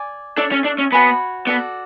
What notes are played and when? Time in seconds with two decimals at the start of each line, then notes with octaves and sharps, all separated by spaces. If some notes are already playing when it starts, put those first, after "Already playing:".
Already playing: D5 G#5
0.37 D4 A4 C#5 E5
0.52 C#4
0.65 D4
0.78 C#4
0.92 B3 F#4 C#5 G#5 B5
1.47 B3 F#4 A4 D5